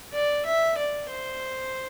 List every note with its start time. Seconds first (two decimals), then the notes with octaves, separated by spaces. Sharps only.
0.13 D5
0.45 E5
0.78 D5
1.09 C5